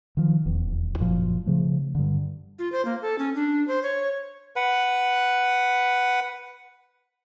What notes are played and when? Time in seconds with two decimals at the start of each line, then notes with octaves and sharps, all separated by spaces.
0.17 D#3 F3
0.45 D#1 E2
0.99 F#1 A#2 F3
1.46 C#3 F3 A3
1.95 G2 D3
2.59 F4
2.72 C5
2.85 A#3
3.02 A4
3.18 C#4
3.35 D4
3.68 C5
3.83 C#5
4.56 B4 F#5